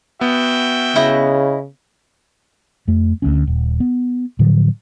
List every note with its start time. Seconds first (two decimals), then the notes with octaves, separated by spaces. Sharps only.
0.21 B3 F#4 E5 G5
0.96 C#3 E4 D#5
2.88 F2 A3
3.22 D2 G#3 C#4
3.47 D#1
3.80 B3
4.39 A2 D3 F3 F#3